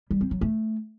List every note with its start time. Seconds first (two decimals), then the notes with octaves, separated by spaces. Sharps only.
0.11 G3
0.21 C4
0.31 F#3
0.41 A3